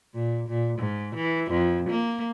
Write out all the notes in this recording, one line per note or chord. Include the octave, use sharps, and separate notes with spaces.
A#2
A#2
G#2
E3
F2
A#3